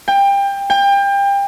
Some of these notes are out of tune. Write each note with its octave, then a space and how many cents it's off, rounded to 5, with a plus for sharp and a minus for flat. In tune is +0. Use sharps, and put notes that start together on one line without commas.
G5 +25
G5 +30